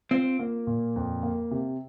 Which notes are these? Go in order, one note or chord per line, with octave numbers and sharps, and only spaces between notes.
C4 F4
A#3
A#2
F2
A#3
C3